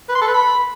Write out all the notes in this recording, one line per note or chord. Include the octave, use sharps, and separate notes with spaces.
B4
C6
A4
B4
B5